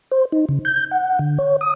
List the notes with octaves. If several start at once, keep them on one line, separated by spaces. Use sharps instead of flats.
C5
D#4
C#3
G6
F#5
D3
C#5
D#6